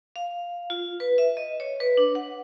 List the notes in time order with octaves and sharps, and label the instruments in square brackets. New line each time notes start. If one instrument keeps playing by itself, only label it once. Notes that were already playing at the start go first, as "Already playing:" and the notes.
[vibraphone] F5
F4
B4
E5
D#5
C#5
B4
D4
F#5